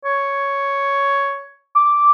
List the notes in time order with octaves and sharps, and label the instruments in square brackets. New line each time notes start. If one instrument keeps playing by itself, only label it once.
[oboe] C#5
[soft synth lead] D6